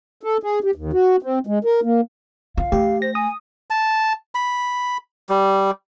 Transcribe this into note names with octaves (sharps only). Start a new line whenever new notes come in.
A4
G#4
G4
D#2
F#4
C4
G#3
A#4
A#3
F4 F5
A3 G4
C5 A#6
G#5 D#6
A5
B5
G3